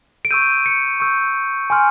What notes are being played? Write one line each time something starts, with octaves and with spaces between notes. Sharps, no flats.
D7
C#6 E6 G6 D#7
C#7
C#6 E6 G6
G#5 C6 F6